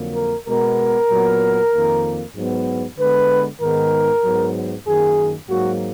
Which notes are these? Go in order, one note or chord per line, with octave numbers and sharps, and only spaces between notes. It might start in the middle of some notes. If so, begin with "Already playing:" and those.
Already playing: F2 D3 F#3 A#3
A#4
B2 G#3 B3 A#4
A#2 F#3 B3
F2 D#3 A#3
G#2 F#3 B3
D3 G#3 B3 B4
G#2 D#3 G#3 B3 A#4
G#2 F#3 B3
F#2 D#3 A#3 G#4
G#2 F#3 A#3 F#4